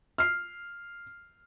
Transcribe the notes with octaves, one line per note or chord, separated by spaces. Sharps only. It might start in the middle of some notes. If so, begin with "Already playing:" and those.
F6 C7